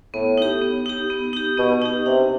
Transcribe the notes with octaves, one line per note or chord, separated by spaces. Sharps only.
A2 B3
D#4 G4
B3
D#4 G4
B3
D#4 G4
B2 B3
D#4 G4
C3 D4